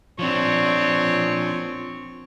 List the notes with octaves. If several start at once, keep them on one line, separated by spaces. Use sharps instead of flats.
F3 C4 D4 C#5